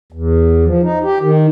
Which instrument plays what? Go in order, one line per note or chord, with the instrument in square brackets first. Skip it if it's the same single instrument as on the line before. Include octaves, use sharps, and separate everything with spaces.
[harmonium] E2
F3
D#4
G4
D#3